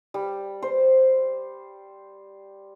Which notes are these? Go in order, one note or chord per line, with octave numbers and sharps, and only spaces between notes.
G3
C5